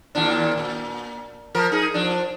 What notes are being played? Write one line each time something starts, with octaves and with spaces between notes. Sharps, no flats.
D#2 A#2 D4
A#2
F3 A#4
D#4 G#4
F3 D4